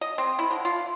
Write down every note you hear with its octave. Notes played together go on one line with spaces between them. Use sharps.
D#5
C4
E4
D3
F4